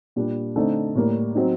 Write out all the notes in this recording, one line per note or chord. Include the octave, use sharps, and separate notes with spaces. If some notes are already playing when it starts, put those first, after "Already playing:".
A#2 G3 D4
D3 A3 C4 D#4
A2 G3 A#3
F#3 C4 D#4